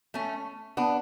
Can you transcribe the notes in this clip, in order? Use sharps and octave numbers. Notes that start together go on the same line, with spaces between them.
A3 C#4
B3 D4